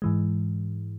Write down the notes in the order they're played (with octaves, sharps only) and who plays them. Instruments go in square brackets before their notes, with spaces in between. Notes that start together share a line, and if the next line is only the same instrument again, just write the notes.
[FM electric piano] G#2 E3 G#3